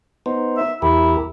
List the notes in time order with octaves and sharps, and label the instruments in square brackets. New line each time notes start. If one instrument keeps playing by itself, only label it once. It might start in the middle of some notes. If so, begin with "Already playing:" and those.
[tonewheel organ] B3 D#4 C5
[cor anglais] E5
[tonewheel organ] E2 G4 A#4 [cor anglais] E4